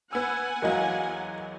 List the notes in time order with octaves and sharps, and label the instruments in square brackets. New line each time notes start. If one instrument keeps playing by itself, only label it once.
[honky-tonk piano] B3 E6 [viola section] F#5 G#5
[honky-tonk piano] E2 F#3 [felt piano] A#4 D#5 F5